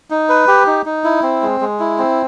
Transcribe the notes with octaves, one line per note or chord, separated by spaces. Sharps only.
D#4
B4
G4
D#4
D#4
E4
C4
G#3
G#3
E4
C4